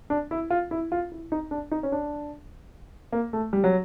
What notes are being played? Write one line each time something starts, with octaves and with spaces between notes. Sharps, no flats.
D4
E4
F4
E4
F4
E4
D#4
D4
D#4
C#4
D4
A#3
A3
G3
F#3